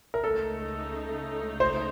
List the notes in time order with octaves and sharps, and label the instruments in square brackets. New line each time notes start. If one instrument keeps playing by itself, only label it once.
[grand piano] A#4
[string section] C#2 C#3 A3 D#4 [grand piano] A4
[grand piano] C5